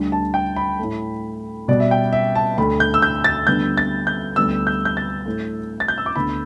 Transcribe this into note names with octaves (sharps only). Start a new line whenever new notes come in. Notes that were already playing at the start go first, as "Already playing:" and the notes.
Already playing: D2 D3 G3
A5
G5
B5
A2 A3
B2 G3 B3 D5
E5
G5
E5
A5
D2 D3 A3 B5
G6
E6
G6
A6
D2 D3 G3 B3 G6
A6
G6
D2 D3 G3 B3 E6
G6
G6
A6
A2 A3
A6
G6
E6
D6
D2 D3 B3 B5